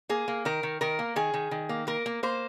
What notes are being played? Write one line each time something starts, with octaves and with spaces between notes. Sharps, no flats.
A#3 G#4
A#3
D#3 A#4
D#3
D#3 A#4
A#3
D#3 G#4
D#3
D#3
A#3
A#3 A#4
A#3
A#3 C5